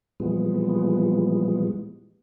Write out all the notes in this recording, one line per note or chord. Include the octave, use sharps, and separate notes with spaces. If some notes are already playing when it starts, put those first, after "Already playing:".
A#2 E3 F3 G3 G#3 B3